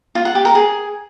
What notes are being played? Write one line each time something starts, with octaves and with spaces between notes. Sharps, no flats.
F4
F#5
G4
A#4
G#4